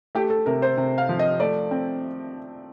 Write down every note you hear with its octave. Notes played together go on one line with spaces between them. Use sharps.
A3 G4
A4
C3 A#4
C5
C3
F5
F3
D#5
A3 D5
C4